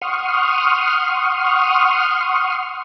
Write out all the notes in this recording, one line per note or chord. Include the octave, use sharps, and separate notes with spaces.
F#5 C6 C#6 D#6 F6